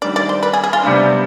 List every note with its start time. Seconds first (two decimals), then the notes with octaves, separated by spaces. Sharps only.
0.02 D#3 G3 D4 D5
0.16 D5
0.29 C5
0.43 B4
0.53 G#4
0.64 G#4
0.73 F4
0.83 C3 G3 B3 D4